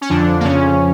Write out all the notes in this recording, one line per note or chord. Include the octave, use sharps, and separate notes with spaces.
C#4
F2 D3 F3 D4
A#3
F2 C#3 F3 C#4